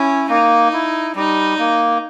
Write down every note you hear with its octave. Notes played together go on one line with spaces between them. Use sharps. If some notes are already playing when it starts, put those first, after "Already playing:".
Already playing: C#4 E4
A#3 D#4
E4
G3 D#4
A#3